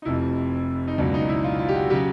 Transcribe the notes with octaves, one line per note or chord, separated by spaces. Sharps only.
D#4
F1 F2 C3 E4
D#4
C#2 B2 F#3 D4
D#4
E4
F4
F4
G4
F#4
C#3 F#3 G4